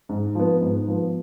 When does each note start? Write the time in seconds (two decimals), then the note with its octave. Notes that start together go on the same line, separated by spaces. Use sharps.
0.09 G#2
0.35 F3 B3
0.61 G#2
0.88 F3 B3